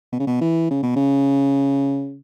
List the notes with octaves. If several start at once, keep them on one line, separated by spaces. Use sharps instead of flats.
B2
C#3
B2
E3
C#3
B2
C#3